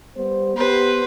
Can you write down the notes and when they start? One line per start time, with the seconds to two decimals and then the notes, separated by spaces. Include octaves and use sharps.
0.15 G3 B3 C5
0.56 B3 G4 B4 C5